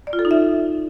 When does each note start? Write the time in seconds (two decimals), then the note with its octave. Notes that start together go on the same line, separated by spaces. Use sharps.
0.07 D5
0.13 F4
0.19 A4
0.25 D#4
0.31 E5